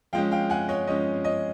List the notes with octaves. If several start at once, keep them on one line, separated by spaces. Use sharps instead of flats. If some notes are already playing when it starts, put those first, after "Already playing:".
F3 G#3 C#4 F5 G5
F5 G5
F#5 G#5
C#5 D#5
F3 G#3 C#4 C#5 D#5
C#5 D#5